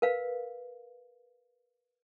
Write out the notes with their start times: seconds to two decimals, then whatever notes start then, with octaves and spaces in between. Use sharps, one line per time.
0.02 A#4 B4 F5